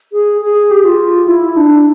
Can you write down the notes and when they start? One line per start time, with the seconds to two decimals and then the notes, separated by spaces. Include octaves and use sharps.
0.13 G#4
0.42 G#4
0.71 G4
0.85 F4
1.28 E4
1.56 D4